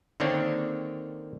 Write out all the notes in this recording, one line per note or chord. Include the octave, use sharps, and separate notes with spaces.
D3 D#3 A#3 C4 D4 C#5